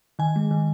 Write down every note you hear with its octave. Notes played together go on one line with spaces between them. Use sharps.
D#3 G#5
G#3
D#3